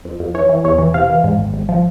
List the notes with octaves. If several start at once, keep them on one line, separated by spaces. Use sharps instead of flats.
F2
F2
E3 C#5
E3
E2 C#5
E3
C3 F5
E3
G#2
G#1
G#1
F3